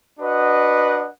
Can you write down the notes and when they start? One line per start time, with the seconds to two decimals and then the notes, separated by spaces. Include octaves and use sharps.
0.19 D4 F#4 B4 D#5 F#5